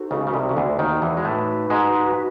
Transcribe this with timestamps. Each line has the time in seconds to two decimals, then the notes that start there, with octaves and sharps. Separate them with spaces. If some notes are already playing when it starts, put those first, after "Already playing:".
Already playing: D#4 F#4 A4 C5
0.11 C#2 C#3
0.27 C#3
0.34 C2 C3
0.49 C#3
0.57 D2 D3
0.79 D#2 D#3
1.02 E2 E3
1.17 G#3
1.25 A2 A3 D#4 F#4 B4
1.70 G#2 G#3